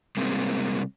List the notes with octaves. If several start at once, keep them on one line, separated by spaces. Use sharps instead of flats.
C3 G3 G#3 A#3 C4